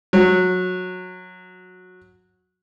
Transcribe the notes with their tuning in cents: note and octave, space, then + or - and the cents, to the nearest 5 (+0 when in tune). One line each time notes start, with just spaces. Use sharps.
F#3 -20